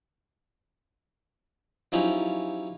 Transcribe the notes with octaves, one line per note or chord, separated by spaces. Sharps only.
F3 F#3 C#4 D#4 E4 G4